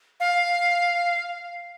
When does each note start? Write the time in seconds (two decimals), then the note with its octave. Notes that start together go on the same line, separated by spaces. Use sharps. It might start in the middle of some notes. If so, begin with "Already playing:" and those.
0.20 F5